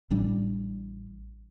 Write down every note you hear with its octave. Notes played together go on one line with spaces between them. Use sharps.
A1 A2 G3 D4